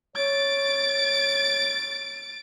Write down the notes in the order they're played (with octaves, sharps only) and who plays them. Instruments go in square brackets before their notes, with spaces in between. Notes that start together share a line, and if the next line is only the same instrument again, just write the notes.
[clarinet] C#5 [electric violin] A6 D7